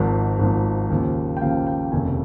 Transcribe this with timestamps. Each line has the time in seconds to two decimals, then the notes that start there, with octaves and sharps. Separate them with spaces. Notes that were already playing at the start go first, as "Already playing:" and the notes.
Already playing: G#1 G#2 F3
0.39 G#1 G#2 F3
0.90 D#2 C#3 F3
1.37 G5
1.41 D#2 C#3 F3 F5
1.67 G5
1.92 F1 D#2 C#3 G#5